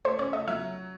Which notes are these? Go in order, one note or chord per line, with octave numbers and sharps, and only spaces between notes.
A3 C5
C#4 C#5
A3 D#5
F#3 E5